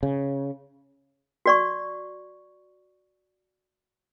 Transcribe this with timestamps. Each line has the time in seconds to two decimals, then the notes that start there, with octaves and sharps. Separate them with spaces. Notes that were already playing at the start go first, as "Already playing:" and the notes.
0.03 C#3
1.46 F#4 D5 C#6